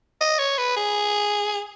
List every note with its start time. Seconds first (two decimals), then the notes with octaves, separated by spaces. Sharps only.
0.21 D#5
0.39 C#5
0.58 B4
0.77 G#4